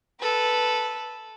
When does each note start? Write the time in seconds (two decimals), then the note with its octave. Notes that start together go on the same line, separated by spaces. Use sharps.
0.20 A4 B4